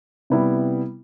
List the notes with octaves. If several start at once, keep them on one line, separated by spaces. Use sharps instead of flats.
C3 G3 B3 E4